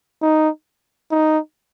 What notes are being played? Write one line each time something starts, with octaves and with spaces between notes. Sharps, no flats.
D#4
D#4